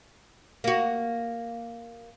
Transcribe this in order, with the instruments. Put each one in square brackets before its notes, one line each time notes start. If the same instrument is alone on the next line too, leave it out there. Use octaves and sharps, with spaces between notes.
[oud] A#3 F#4